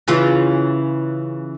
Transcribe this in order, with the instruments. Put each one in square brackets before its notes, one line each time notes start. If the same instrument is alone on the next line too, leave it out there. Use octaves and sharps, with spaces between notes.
[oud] C#3 E3 F4